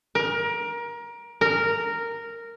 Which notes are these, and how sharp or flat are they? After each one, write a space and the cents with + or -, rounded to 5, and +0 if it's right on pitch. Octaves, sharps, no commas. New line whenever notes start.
A#4 +25
A#4 -10